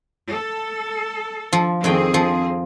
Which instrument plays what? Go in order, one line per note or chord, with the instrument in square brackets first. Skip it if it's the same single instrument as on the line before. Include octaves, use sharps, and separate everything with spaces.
[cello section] A4
[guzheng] F3
[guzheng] F2 D#3 G5 [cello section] C4 G#4
[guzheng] F3